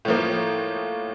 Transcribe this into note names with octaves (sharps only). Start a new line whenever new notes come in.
A2 F3 A#3